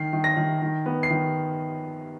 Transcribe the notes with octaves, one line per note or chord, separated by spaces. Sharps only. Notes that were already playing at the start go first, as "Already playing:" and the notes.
Already playing: D#3 C7
D#3
A#6
D#3
D#3
B3
C7
D#3